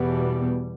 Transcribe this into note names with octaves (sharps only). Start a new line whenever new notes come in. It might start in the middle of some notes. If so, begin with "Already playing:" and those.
Already playing: E2 B2 G3 B3